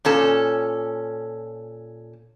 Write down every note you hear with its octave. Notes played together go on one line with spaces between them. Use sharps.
A#2 C#4 A4